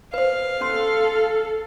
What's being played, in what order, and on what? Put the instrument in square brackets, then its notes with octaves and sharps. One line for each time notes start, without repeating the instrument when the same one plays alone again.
[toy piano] B4 C5 [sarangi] F5
[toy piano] C#4 C6 [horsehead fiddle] A4